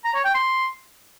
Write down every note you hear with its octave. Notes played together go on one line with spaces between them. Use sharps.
A#5
C#5
G5
C6